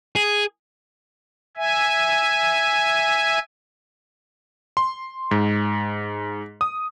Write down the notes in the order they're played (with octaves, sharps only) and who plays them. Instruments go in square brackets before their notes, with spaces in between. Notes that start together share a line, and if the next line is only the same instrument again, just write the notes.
[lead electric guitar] G#4
[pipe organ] E5 G#5
[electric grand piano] C6
G#2
D#6